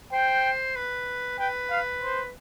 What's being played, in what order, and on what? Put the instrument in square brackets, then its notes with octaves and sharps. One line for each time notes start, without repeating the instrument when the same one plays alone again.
[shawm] C5 [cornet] G5
[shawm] B4
[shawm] B4 [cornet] G5
[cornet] F5
C5